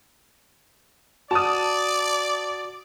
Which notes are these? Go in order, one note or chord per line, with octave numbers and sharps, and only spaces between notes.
F#4 D5 A5 D#6